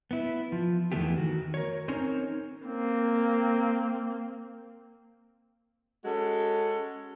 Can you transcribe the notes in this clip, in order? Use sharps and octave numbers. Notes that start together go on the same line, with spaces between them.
B3 E4
F3
E2 D#3 E3 A3 B3 G4
D#3 F#4
A#4 C#5
C4 C#4 D#4 A#4 C5 C#5
A#3 C4
G#3 C#4 F#4 A4